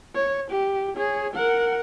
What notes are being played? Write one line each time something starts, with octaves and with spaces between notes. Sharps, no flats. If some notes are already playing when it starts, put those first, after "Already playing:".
C#5
G4
G#4 C#5
A#4 F#5